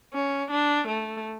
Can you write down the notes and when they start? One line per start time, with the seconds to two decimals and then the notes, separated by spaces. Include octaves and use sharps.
0.13 C#4
0.51 D4
0.88 A3